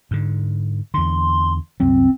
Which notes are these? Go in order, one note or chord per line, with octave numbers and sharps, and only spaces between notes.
G#2 D3
E2 D3 C6
C2 F#2 F#3 C4